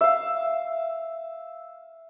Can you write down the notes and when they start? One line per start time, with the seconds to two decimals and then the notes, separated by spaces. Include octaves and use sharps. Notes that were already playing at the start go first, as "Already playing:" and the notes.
0.01 E5 F5